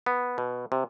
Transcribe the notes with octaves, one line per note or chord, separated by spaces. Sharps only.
B3
B2
C3